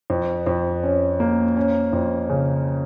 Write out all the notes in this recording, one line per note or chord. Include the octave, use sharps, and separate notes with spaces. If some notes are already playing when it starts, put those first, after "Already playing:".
F2
F2
C#4
A#3
C#4
F2
C#3